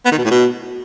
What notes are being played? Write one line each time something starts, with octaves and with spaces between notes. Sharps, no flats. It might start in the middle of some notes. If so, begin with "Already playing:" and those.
B3
D#3
B2
A2
B2